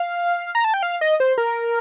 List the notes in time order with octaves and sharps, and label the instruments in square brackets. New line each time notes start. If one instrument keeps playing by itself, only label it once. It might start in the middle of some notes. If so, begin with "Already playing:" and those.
Already playing: [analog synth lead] F5
A#5
A5
G5
F5
D#5
C5
A#4